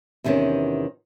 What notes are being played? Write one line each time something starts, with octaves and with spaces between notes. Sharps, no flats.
E2 C3 D#3 B3 C#4